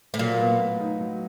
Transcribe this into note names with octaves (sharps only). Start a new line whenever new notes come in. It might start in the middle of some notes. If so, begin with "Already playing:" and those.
A2
A#2 F#3
B3
A2
D#4
F#3